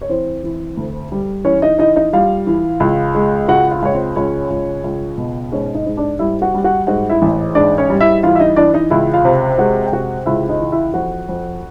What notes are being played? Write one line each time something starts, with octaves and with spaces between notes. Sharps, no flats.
C#5
E3 C4 C5
E3
D2
G3
E3 C#4 C#5
D#4 D#5
E3 D#4 D#5
D#4 D#5
G3 F4 F5
E3
C#2
G#3
C#2 F#4 F#5
F4 F5
C#2 C#5
C4 C5
C#2 C#4 C#5
C#2
C#2
B2
G#2 C#4 C#5
D#4 D#5
G#2
D4 D5
G3 E4 E5
F#4 F#5
G3
F#4 F#5
G#2 F#4 F#5
E4 E5
A1
G#2 D4 D5
C#4 C#5
G3
E4 E5
E3 F4 F5
E5
D#4 D#5
E3 D4 D5
D#4 D#5
C#2 E4 E5
F4 F5
C3
G#3 F#4 F#5
G5
C3 F#4 F#5
C#2 E4 E5
D#4 D#5
E3
E4 E5
F2 F#4 F#5
F2